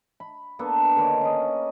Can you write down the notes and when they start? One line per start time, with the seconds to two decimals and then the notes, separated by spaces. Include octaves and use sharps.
0.20 B5
0.59 A#3 B3 D4 A4
0.96 D3 D#3 A#4 C#5
1.21 C#4 D#5